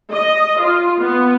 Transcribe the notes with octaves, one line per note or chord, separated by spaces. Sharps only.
D#5
F4
B3